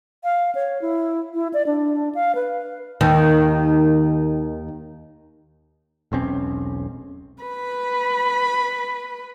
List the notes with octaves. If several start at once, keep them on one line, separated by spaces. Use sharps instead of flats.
F5
C#5
E4
E4
D5
D4
F5
B4
D#2 D#3
E1 B1 C4 C#4
B4 B5